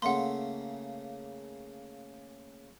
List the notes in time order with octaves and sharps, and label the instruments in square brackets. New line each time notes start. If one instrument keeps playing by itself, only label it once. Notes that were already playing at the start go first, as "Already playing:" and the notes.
[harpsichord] C#3 A3 A#3 [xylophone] F#5 C6